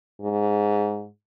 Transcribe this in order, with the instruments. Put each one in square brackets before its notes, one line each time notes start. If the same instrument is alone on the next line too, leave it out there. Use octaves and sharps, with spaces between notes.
[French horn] G#2